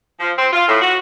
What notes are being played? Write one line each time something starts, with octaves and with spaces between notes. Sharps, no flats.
F3
C4
F4
A2
F#4